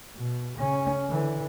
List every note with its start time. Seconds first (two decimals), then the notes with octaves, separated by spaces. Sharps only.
0.15 B2
0.59 C#3 C#4
1.10 D3 E3